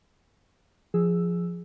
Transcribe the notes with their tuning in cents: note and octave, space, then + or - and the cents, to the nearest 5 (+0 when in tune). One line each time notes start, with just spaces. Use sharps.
F3 +0 G#4 +0 E6 +0